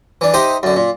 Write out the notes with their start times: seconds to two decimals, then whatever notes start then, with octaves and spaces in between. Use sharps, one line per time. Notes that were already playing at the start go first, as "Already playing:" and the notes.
0.21 E3 D4
0.34 D#4 G4 C5 D#5 E5
0.63 F#2 D3
0.76 A#2